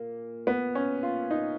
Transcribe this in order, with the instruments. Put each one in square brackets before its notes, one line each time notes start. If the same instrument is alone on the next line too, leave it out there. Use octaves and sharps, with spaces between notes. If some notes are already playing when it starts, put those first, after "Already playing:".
Already playing: [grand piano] A#2 A#3
B3
C#4
F4
D#4